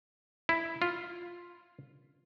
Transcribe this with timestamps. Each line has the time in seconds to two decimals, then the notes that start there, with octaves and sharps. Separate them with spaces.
0.49 E4
0.82 F4